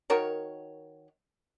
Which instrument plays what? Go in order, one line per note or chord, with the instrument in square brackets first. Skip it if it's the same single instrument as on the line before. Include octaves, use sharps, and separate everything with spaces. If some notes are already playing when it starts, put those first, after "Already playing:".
[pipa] D#3 F#4 A#4 C#5